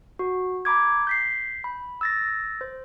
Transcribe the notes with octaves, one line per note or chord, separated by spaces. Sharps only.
F#4
A#5 B5 D6 G#6
G6 B6 C7
B5
E6 A6 A#6
C5